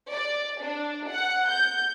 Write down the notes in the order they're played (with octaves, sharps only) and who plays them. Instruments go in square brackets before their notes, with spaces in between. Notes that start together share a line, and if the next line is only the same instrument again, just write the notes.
[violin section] D5
D4
F#5
G6